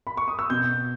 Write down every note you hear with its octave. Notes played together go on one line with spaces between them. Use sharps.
B5
C#6
D#6
E6
B2 G6